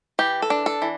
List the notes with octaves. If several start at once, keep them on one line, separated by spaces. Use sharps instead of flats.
E3 G4
A4
D4
A4
E3